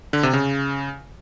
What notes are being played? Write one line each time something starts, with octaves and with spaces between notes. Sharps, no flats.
D3
C3
C#3